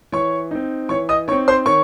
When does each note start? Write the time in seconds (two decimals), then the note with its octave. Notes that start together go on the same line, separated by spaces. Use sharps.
0.12 E3 C#5 C#6
0.51 C4 D#4
0.89 E3 C#5 C#6
1.09 D#5 D#6
1.28 D#4 C#5 C#6
1.32 C4
1.48 C5 C6
1.66 D#3 C#5 C#6